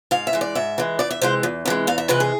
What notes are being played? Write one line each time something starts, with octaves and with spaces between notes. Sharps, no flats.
G#2 F5
E5
E3 G#3
D5
G#2 E5
E3 G#3
E2 D5
E5
C3 E3 G#3 C5
E2
C3 E3 G#3
E2 F5
E5
C3 E3 G#3 B4
G#4